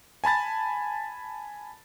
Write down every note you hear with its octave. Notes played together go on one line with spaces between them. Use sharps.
G#5 A5 B5 A6